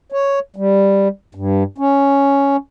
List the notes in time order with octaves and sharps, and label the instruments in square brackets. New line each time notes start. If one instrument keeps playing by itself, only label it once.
[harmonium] C#5
G3
G2
C#4